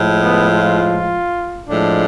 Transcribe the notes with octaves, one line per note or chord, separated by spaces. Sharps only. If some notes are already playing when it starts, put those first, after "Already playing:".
Already playing: A2 F3 G#3
B3
F4
A2 F3 G#3 D4